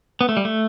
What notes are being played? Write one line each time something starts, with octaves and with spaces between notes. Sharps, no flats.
B3
A3
G3
A3